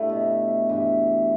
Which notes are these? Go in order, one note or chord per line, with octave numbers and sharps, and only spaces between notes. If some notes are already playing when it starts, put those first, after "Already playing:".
Already playing: G2 A3 E4
B2
G2 E3